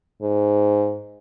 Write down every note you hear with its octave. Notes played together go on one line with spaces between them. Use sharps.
G#2